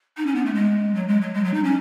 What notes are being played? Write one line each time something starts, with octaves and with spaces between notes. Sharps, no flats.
D#4
C#4
B3
A3
G#3
F#3
G#3
F#3
G#3
F#3
D#4
C#4